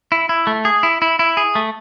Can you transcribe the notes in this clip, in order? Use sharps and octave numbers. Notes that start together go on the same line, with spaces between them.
E4
E4
A3
G#4
E4
E4
E4
G#4
A3